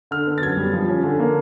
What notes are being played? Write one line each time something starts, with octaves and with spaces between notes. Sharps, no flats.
D3 F6
B3
A6
F#2 G#6
G3
F3
C#4
D3
A#3